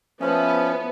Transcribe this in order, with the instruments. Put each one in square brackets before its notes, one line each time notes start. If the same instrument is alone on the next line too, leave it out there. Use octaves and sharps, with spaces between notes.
[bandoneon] F3 C#4 [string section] B3 [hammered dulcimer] E4 A4 C5